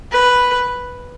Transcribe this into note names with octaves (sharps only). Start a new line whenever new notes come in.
B4